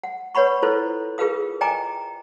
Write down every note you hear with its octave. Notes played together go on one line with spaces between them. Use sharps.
F#5
B4 C#5 F#5 B5 C#6
E4 F4 A4 B4 C5
F4 G#4 A#4 B4 F5 D#6
D#5 G5 G#5 A#5 D6